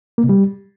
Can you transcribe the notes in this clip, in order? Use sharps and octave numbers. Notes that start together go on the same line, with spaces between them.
A#3
C3
G3